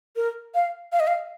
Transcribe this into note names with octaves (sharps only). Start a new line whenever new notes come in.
A#4
F5
F5
D#5
F5